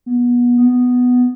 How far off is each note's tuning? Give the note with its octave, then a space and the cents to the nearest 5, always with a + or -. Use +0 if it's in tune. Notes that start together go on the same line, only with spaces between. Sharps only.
B3 -25
B3 +5